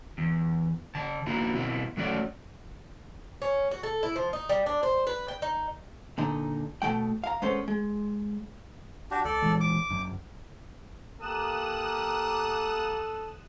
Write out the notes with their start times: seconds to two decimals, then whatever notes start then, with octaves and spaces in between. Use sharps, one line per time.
0.18 E2
0.95 C#3 A5
1.26 A#3 B3 D#4 E4 F#4
1.55 B2 C4 E4
1.97 F#3 A3 C#4 F#4 D5
3.42 C#4
3.71 F#4
3.83 A4
4.03 E4
4.16 F3
4.33 D#4
4.49 G3
4.66 D4
4.83 C5
5.07 B4
5.28 G5
5.42 D#4
6.18 A#2 D3 D#4
6.82 B2 F#3 A3 G5
7.24 F5 A#5
7.42 G#3 B3 C#4 A4 C5
7.68 G#3
9.11 D4 F#4 G4
9.25 C#2 A4 D5
9.42 A#2 E3 G#3
9.61 D6
9.91 F#1 F#2
11.21 A#3 G4 A4 D#6 F#6 E7